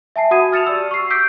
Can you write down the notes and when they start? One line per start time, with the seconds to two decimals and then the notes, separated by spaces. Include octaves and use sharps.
0.16 E5 G#5 A5 C7
0.31 F#4 F#5 D#6 G#6 D#7
0.52 F6 A6 C#7 E7 F7
0.67 G4 D5 E6
0.91 C#6 C7
1.10 D6 E6 G6 B6 C7 D7